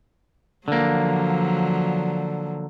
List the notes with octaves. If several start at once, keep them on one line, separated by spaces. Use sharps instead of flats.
D3 F3 F#3 A#3